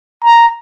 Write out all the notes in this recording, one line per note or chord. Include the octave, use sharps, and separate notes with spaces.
A#5